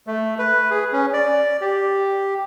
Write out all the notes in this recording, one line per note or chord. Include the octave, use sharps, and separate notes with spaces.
A3
B4
G#4
C#4
D5
G4